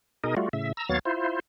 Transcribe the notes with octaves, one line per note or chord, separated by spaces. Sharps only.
B2 D#4 G#4 A#4 D#5
G3 A3 F4 F#4
A2 C#3 E5
A#5 E6
D#2 F#3 B3 C#5 F5 A6
E4 F4 C5